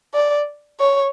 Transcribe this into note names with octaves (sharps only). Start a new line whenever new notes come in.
D5
C#5